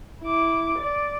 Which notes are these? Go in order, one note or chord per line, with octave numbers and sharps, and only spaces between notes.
E4 D6
D5